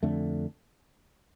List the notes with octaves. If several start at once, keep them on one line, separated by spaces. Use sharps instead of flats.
F2 D3 A3